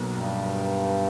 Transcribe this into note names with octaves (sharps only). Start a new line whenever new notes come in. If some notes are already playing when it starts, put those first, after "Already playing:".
Already playing: B1 B2 F#3 A#3
G2